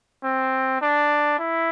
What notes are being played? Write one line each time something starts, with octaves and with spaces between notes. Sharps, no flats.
C4
D4
E4